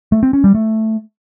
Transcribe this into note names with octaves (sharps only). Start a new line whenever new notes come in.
A3
C4
C#4
G3
A3